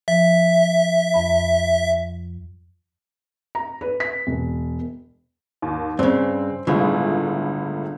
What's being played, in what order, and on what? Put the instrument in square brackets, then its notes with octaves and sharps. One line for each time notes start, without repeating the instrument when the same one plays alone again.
[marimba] F3 [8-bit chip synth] E5
[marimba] F2 B5
[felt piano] A#5
B4
B6
E1
[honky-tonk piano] D#2
[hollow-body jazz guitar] G2 C#3 [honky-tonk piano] C4
[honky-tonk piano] G1 C#2 A2 [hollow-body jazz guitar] D3